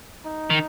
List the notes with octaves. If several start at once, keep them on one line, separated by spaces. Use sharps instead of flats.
D#4
D#3